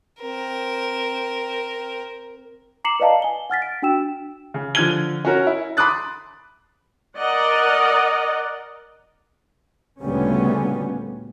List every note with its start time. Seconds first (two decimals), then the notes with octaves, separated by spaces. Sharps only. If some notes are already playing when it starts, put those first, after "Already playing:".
0.22 C4 A#4
2.85 A#5 D6 C7 C#7 E7 F#7
3.00 B4 D5 D#5 F5 A5 A#5
3.22 G#5 G7
3.50 F#5 F6 A6 B6
3.62 D7
3.82 D4 F#4 G5 E6 E7
4.54 C#3
4.75 D3 F3 F6 G#6 D#7 G7
5.25 C#4 F#4 A#4
5.47 E4
5.77 B5 C6 D6 D#6 F#6 A6
7.17 A#4 D5 D#5 F#5
10.02 D2 A#2 C#3 G3 B3 C#4